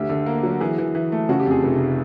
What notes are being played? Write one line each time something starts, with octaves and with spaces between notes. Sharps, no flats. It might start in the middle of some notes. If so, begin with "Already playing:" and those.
Already playing: D2 G4
D3
A#3
F#3
E3 G#4
E3
E3
A3
C#3 F#4
G4
F2
G#4
F1